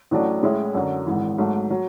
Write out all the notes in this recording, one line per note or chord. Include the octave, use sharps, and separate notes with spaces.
A1 A2 F#3 A3 D4
A2 G#3 C#4 E4
F#2 D3 F#3
G#1 G#2 E3
G#2 F#3 A3
F#3